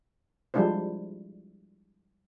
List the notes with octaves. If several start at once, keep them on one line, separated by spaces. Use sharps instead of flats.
F3 G3 G#3 D4 E4 C5